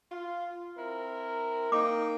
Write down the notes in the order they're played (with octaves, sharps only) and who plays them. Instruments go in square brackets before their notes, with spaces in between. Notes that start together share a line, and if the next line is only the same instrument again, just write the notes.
[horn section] F4
C4 E4 A#4
[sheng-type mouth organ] A#3 G5 [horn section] D#4 [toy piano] D6